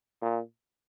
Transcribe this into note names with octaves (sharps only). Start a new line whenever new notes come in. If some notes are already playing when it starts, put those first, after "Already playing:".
A#2